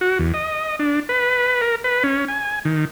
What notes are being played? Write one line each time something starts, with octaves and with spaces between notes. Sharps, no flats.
F#4
E2
D#5
D4
B4
A#4
B4
C#4
G#5
D#3